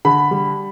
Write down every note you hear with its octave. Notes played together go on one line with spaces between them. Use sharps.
D3 B5
G3